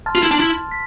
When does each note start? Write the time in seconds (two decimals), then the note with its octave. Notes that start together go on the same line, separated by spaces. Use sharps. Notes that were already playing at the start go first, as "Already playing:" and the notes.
0.06 A5 C6 F6 A6
0.15 F4
0.23 E4
0.31 D4
0.40 E4
0.71 B6